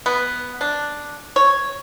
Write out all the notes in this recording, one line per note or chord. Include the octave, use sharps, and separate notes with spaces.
B3
D4
C#5